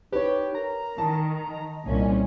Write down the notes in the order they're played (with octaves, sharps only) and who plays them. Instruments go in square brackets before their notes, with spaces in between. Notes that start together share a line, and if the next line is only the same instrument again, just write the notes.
[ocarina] D#4 [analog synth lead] G4 [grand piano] B4 C#5
[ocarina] A#4 [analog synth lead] A#5
[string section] D#3 [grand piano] A5
[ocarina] D#5
[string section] C2 A#2 C#4